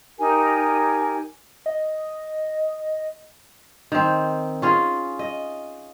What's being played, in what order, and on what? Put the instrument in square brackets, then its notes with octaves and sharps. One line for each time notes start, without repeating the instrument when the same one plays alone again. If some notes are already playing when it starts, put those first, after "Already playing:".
[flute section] D#4 G4 A#4 G#5
[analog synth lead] D#5
[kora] D#3 C4
C#4 F4 G#4
D#5